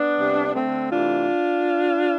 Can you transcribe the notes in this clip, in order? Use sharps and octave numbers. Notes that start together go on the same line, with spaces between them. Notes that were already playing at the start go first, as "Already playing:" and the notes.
Already playing: B3 D4
C3 G3
D3 A3 C4
C3 E3 A3 D4 F4